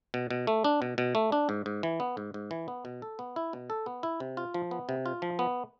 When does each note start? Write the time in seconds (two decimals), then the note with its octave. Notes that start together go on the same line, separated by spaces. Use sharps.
0.14 B2
0.31 B2
0.47 A3
0.65 D4
0.82 B2
0.98 B2
1.15 A3
1.32 D4
1.49 G#2
1.66 G#2
1.83 E3
2.00 B3
2.17 G#2
2.34 G#2
2.51 E3
2.68 B3
2.85 B2
3.02 A4
3.19 B3
3.36 E4
3.53 B2
3.70 A4
3.86 B3
4.03 E4
4.20 C3
4.37 F4
4.54 F3
4.71 B3
4.89 C3
5.06 F4
5.22 F3
5.39 B3